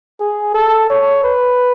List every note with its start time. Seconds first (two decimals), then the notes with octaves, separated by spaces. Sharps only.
0.20 G#4
0.54 A4
0.90 C#5
1.24 B4